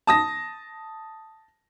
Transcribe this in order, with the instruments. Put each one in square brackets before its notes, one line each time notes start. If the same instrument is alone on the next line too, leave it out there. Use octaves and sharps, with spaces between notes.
[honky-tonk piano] A5 D#6 A#6